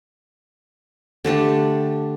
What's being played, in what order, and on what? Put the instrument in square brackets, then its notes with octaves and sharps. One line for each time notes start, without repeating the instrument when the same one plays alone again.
[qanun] D3 A3 D4 G4